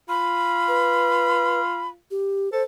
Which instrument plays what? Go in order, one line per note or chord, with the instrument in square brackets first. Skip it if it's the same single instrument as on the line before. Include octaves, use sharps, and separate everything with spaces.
[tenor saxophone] F4 [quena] B5
[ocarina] B4
G4
[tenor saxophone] A4 [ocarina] C5